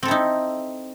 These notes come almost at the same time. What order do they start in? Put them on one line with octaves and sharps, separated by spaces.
C4 A4 E4 D#4